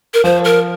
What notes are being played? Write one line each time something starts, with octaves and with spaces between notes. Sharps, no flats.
A#4
F3 C5
A#4